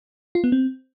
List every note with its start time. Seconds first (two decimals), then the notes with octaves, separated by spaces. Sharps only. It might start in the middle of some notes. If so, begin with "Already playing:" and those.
0.35 F4
0.44 B3
0.52 C4